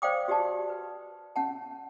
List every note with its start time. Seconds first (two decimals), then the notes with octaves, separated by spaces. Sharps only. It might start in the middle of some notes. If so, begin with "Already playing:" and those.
0.02 C5 D5 F5 G5 D6 D#6
0.28 F#4 G4 D5 A5
0.70 B4
1.36 C#4 F#5 A5